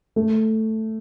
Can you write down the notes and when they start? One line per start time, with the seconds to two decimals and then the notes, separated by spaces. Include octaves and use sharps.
0.16 A3